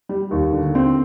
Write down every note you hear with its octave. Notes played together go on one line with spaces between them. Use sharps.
G3
D#2
D3
C4